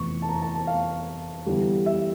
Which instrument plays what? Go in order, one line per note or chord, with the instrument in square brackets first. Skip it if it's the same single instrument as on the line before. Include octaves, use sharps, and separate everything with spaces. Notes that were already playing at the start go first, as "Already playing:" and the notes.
Already playing: [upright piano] F1 E2 E3 C#6
A5
A#5
A5
A5
F5
E2 D3 G3
E5